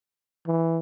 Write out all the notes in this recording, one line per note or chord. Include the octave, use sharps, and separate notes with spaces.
E3